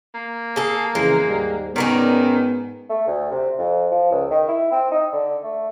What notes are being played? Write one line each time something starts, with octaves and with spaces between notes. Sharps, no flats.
A#3
G#4 A4
F2 C#3 E3 G#3
D#2 G#2 G3
G#2 D#3 B3 C#4 A#4 D5
A3
D2
C3
F2
F3
C#2
D#3
E4
C4
D#4
D3
A3